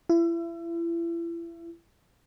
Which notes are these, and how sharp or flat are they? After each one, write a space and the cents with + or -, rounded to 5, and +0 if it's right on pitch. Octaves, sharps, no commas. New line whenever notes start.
E4 +35